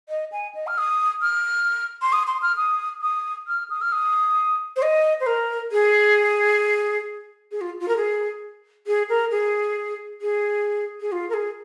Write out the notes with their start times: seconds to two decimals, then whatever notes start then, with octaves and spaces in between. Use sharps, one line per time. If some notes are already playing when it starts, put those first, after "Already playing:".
0.09 D#5
0.32 G#5
0.55 D#5
0.67 F6
0.78 D#6
1.22 F6
2.02 C6
2.12 D#6
2.27 C6
2.42 F6
2.57 D#6
3.02 D#6
3.48 F6
3.70 D#6
3.81 F6
3.92 D#6
4.76 C5
4.82 D#5
5.20 C5
5.26 A#4
5.72 G#4
7.51 G#4
7.61 F4
7.80 F4
7.88 A#4
7.96 G#4
8.87 G#4
9.09 A#4
9.31 G#4
10.22 G#4
11.01 G#4
11.12 F4
11.30 A#4
11.33 G#4